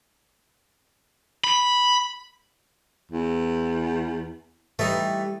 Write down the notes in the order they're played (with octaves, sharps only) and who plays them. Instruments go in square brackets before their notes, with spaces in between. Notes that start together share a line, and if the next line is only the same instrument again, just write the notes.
[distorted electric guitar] B5
[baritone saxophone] E2
[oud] E3 G3 [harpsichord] A3 D#4